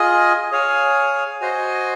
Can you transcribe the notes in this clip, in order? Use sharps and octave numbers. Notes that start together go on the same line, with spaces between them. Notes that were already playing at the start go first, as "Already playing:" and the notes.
Already playing: F4 G#4 D#5 G#5
G#4 C#5 F5 G#5
F#4 C5 D#5 G#5